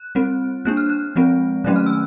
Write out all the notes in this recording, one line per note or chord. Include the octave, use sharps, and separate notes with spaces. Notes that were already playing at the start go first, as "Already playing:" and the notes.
Already playing: F#6
G3 C4
G3 A#3 D4 F#6
F6
F#6
F3 G#3 C4
D#3 F#3 A3 C#4 F#6
F6
E6